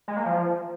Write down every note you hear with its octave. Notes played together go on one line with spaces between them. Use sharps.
G#3
A#3
F3